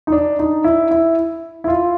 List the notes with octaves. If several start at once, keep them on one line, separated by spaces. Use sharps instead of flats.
D#4
D4
D#4
E4
E4
E4
F4